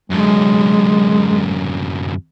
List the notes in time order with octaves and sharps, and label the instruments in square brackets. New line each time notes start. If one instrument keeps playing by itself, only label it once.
[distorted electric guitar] F#2 D3 [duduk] G#3